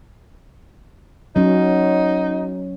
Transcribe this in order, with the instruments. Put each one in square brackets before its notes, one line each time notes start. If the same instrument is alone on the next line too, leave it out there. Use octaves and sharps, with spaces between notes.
[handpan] F#3 C#4 [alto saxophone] D#4